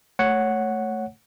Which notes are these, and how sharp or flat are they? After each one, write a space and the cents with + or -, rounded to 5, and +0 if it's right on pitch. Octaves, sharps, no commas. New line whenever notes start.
A3 +0 C#5 +0 F#5 +0